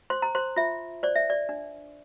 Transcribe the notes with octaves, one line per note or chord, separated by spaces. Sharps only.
C5 C6
A#5
C5 C6
F4 E5
C5 D5
E5
D5
D4